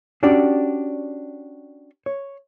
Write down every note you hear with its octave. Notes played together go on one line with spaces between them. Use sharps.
C#4 D4 F#4 G4 D5
C#5